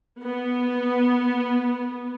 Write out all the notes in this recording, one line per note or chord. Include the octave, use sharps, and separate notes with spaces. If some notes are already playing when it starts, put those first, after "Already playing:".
B3